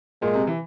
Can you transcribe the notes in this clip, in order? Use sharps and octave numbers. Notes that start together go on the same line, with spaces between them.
A#2 G#3
C3
E3